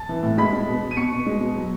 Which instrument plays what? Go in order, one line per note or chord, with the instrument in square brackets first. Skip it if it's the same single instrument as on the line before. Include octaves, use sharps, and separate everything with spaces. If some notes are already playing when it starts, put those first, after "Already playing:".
Already playing: [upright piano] A5 A6
E3
A2
G#3 B5 B6
G#3
B2
B2
D#7
B2 C#6 C#7
B2
G#3
B2
F#3